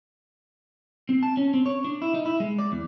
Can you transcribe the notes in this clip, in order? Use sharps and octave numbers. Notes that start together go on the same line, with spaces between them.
C4
A5
C#4
C4
C#5
D4
E4
D#4
E4
G#3
D5
E2